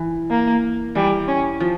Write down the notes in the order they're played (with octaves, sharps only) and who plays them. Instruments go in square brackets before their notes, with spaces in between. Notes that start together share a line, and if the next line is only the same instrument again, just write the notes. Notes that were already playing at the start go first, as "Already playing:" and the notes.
Already playing: [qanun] E3
[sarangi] A#3
[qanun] E3 [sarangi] G3
[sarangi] C#4
[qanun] F3